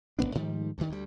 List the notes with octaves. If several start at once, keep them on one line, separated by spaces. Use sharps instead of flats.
E1 G#2 B3 D4
G#2 D#3 F3 G3
D2 G2 D#3
D2 G3